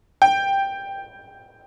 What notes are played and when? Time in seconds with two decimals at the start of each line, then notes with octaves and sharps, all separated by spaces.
0.22 G5